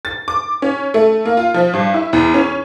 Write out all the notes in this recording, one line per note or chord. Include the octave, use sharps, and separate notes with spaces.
A6
D6
C#4
A3
A#3
F4
F3
G2
E4
E2
C#4